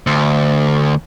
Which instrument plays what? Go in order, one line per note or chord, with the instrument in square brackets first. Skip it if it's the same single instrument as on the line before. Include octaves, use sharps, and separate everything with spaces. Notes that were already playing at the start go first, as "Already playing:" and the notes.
[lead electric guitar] D2